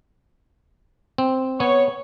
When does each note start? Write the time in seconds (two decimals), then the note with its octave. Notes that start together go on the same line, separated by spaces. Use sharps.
1.18 C4
1.60 B3 C#5